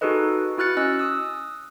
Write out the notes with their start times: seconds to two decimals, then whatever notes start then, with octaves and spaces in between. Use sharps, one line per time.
0.01 D#4 F#4 G#4 A4 B4 D#5
0.58 E4 F#4 F6 F#6 A6 C#7
0.77 C#4 D#5 E6 F#6
0.99 D#6 E6